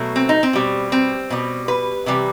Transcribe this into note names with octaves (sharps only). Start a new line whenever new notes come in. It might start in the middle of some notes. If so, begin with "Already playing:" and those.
Already playing: B2 F#3 A3
C4
D#4
C4
B2 G3
C4
B2 G3
B4
C3 E3 G3